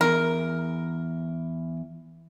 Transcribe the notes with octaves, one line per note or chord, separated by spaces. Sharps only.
E2 A#4